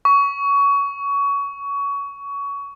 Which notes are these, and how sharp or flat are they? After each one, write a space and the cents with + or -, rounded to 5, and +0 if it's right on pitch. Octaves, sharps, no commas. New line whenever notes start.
C#6 +20